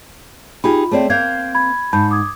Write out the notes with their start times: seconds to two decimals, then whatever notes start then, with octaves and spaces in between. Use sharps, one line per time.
0.64 D#4 F4 G4 G#4 B5
0.91 A3 C4 G#4 C#5 D5 G5
1.10 A#3 C4 F5 G6 G#6
1.55 B5 G#6
1.93 G#2 A5 B5 G6
2.11 D6 D#6 G#6